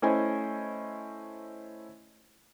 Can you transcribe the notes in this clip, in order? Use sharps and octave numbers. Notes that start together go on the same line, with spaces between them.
A3 C#4 E4 C5 D#5 G#5